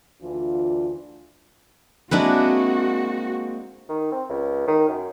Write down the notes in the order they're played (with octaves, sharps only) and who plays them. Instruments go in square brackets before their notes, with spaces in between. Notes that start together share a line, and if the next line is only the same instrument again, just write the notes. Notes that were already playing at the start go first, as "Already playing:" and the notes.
[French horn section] D2 E3 D4 F4
[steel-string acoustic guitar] G#3 A#3 C4 [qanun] D4 E4 B4 [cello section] F#4
[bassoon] D#3
C4
C#2
D#3
F#2